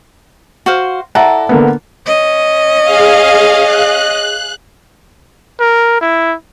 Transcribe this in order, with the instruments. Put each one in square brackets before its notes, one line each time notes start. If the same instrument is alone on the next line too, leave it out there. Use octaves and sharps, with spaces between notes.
[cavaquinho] F#4 C5 F5
[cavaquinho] E4 A4 D5 [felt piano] F#5 A#5
[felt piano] D3 A#3 B3
[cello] C#4 D#5
[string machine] G#4 F5
F#6
[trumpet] A#4
E4